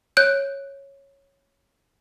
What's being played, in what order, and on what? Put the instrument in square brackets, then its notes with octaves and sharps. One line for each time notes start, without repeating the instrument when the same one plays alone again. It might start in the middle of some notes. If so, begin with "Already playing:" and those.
[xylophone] C#5 F#6 G6 D7